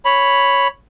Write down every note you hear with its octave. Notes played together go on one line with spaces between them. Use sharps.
C#5 B5